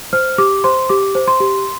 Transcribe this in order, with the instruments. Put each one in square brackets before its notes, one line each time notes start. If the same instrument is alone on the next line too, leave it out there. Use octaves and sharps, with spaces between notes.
[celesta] C5 F6
G4 D6
C5 C6
G4 D6
C5
C6
G4